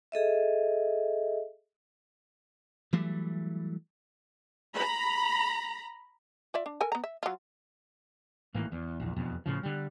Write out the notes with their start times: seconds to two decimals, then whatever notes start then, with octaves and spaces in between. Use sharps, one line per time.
0.12 G#4 A4 D#5 E5
2.93 E3 F#3 G3 A3
4.75 A#5 B5
6.54 F4 D5 E5
6.66 D4
6.81 A4 A#4 G#5
6.92 B3 A#5
7.04 E5
7.23 F#3 F4
8.54 G#1 A2 E3 A#3
8.72 E2
9.00 A#1 E2
9.16 E1 F2 B2
9.46 A2 C#3 F3
9.63 D3 G3